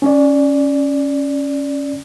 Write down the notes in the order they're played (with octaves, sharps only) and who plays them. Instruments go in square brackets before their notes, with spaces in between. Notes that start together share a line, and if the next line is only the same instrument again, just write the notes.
[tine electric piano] C#4 D5